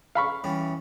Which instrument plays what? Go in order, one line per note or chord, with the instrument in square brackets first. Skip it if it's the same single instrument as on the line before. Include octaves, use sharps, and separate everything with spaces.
[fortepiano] F5 B5 C#6
[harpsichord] C#3 E3 G3